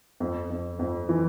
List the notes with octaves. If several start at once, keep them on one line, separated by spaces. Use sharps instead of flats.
F2
F2
F2
E3